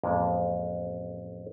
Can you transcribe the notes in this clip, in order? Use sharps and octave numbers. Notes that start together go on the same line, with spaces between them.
A1 F2 G#3 A#3 C5 D5